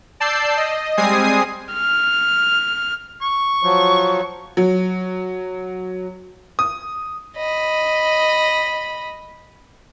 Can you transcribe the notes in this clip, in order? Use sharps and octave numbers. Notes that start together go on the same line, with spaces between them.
D5 A5 E6 G6 C7
D#5
G3 G#3 C4 G#5 D#6 C7
F6
C#6
F3 F#3
F#3
D#6
D#5 B5